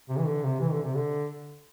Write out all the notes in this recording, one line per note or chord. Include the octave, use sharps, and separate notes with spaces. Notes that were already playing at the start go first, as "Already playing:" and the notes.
C3
E3
D3
C3
E3
D3
C3
D3